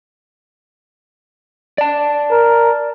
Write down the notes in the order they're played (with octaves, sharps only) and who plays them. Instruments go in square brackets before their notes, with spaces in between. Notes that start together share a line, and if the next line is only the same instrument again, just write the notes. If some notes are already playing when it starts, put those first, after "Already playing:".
[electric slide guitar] D5 A5
[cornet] A#4